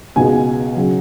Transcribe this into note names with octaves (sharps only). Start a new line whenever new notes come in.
C#2 B2 G#3 G#5
C#3 F#3